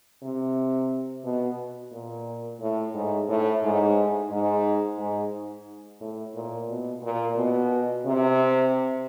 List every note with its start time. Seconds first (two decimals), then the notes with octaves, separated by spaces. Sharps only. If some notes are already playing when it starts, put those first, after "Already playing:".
0.23 C3
1.24 B2
1.92 A#2
2.61 A2
2.94 G#2
3.29 A2
3.62 G#2
4.31 G#2
4.98 G#2
6.00 A2
6.34 A#2
6.69 B2
7.02 A#2
7.36 B2
8.05 C3